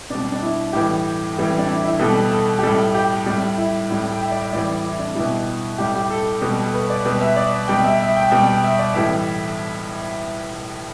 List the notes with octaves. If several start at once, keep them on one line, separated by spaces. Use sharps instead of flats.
B2 G3 D4
D4
D4
E4
A2 E3 G3 G4
A2 E3 G3
D4
E4
E4
B2 G3 A4
A4
G4
A2 G3 A4
G4
A2 G3
E4
A2 G3
G5
E5
D5
E5
A2 E3 G3 D5
E4
D4
B2 G3 E4
A2 G3 G4
G4
A4
B2 G3
A4
B4
D5
B2 G3 B4
E5
D5
B2 G3 G5
E5
E5
G5
B2 G3 G5
G5
E5
D5
A2 E3 G3 E5